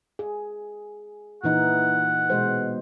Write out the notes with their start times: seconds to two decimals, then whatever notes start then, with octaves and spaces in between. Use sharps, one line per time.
0.19 G#4
1.44 A#2 E3 D#4 F#5
2.30 B2 G#3 C5